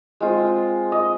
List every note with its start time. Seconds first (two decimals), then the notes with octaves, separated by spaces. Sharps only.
0.20 G#3 C4 F4
0.92 D#5